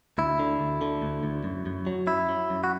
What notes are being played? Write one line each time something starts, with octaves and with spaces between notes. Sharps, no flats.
D2 E4
D3
D2
D3
D2
D2
F#2
F#2
F#3
F#2 E4
F#3
F#2
F#4